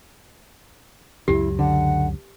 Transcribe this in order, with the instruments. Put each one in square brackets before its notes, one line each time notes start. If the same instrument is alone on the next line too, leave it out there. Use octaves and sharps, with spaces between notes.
[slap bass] C#2 F#2 F#3 [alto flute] E4 [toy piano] G4
[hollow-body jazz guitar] D3 [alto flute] F#5